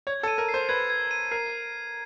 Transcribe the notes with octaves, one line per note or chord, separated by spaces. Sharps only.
C#5 G#6
A4
D#7
A#4
C7
C5
B4 G#6
G#6
D#7
A#4 C7